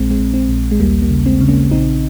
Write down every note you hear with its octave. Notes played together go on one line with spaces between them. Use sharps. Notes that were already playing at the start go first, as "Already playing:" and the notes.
Already playing: A#1 G#3 C4
G#3 C4
A#1
G#3 C4
A#1
G#3
D#2 G3 A#3
G3 A#3
C#3
G#3 C4
C#3
A#3 C#4
A#1 C4 D#4